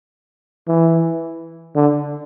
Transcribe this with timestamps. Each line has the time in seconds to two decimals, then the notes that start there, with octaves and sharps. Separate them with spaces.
0.68 E3
1.75 D3